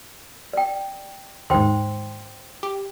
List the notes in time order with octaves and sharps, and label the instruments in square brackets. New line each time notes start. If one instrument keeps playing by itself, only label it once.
[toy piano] D5 G5
[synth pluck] D#2 G#2 [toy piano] C5 G5 C6
[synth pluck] G4